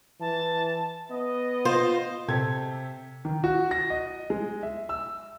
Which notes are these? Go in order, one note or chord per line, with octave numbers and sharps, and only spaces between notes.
E3 A5
B3 D#5
F4 C5
C3 G4 A4 G#6
D#3
F#4
A#6
D#5
G#3
E5
E6